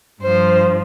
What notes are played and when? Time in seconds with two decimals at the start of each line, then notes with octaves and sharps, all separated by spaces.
0.22 G2 F3 C5